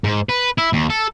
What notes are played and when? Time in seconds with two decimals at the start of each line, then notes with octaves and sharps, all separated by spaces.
0.04 G#2
0.29 B4
0.58 E4
0.73 D#2
0.90 A4